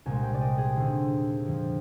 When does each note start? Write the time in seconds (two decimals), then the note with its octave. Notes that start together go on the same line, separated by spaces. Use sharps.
0.06 C2 A#2 G#3 G#5
0.23 G5
0.34 D5
0.41 D#5
0.58 G#4
0.76 D#2 D3 G3 C4
1.44 F2 D3 F3